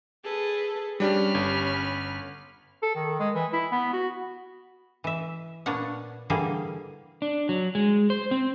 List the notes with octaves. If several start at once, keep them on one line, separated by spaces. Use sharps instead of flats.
G#4 A4 B4
G3 C#4 D4 G4 B5 F6
G1
A4
D#3
G#3
E3
E4
B3
F#4
E3 E5
A#2 B3 D4 C#5 F#5
D3 E3 G3 A#3 G#4
D4
F#3
G#3
C5
C4